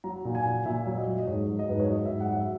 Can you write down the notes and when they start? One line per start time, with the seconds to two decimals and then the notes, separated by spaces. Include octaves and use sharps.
0.04 F#3 A#5
0.25 A#2
0.35 G#5
0.46 A#2
0.66 A#2 E5
0.86 F#3
0.97 D#5
1.07 F#3
1.19 D#5
1.27 G#2 C#5
1.48 F#3
1.59 D#5
1.69 G#2 B4
1.80 C#5
1.90 F#3 D#5
2.06 G#2 E5
2.20 F#5
2.31 F#3
2.36 E5